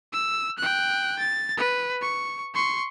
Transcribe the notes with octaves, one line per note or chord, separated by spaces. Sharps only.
E6
G5 F#6
A6
B4
C#6
C6 C#6